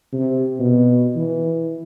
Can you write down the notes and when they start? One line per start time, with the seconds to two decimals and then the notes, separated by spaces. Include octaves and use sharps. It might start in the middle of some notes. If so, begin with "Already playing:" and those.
0.13 C3
0.60 B2
1.16 E3